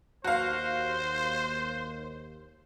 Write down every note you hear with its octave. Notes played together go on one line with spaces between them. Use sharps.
D#2 F#4 C5 F5